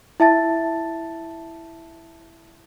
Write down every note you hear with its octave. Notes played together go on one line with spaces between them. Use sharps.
E4 E5 A5 A6